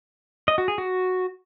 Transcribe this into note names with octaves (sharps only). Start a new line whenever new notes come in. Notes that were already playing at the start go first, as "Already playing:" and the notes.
D#5
F#4
G#4
F#4